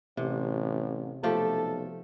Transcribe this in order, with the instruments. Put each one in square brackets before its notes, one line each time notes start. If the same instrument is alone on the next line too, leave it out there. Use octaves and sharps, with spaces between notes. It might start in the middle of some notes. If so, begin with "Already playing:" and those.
[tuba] A1 [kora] C3
[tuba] B1 [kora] F3 A3 G4 [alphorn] A4